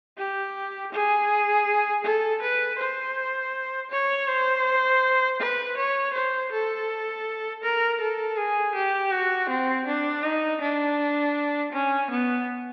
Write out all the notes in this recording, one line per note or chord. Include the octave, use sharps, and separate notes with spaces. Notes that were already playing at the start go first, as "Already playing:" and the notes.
G4
G#4
A4
B4
C5
C#5
C5
B4
C#5
C5
A4
A#4
A4
G#4
G4
F#4
C4
D4
D#4
D4
C#4
B3